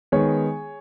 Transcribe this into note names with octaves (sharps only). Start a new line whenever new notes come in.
D#3 G#3 B3 G#4 C#5